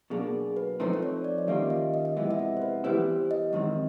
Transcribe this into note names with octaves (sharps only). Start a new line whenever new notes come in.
B2 F#3 A#3 D4 G#4
B4
F3 A3 C4 D#4 C5
C5
C#5
D5
D#5
D#3 G3 A#3 C#4 F4 E5
D#5
D#5
D#5
F2 C3 E3 G#3 B3 E5
E5
D#5
C5
B4
E3 G3 B3 E4 C5
D#5
F#2 D#3 G#3 C4